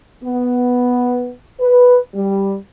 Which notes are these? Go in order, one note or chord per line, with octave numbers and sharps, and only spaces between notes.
B3
B4
G3